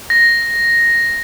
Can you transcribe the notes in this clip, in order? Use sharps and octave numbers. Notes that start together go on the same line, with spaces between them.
A#6